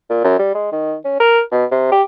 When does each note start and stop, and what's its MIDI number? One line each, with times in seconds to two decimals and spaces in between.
0.10 0.23 46
0.24 0.38 42
0.39 0.52 55
0.55 0.67 56
0.72 0.94 51
1.05 1.16 61
1.20 1.41 70
1.51 1.65 47
1.71 1.87 48
1.92 2.02 67